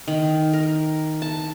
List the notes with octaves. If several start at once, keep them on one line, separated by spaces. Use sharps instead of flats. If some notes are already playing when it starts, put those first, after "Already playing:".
D#3
A#4
A5